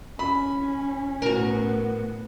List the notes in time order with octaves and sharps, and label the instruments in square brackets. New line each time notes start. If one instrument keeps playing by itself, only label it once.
[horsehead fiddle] C#4 [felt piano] B5
[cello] A2 B3 [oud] F#4 A#4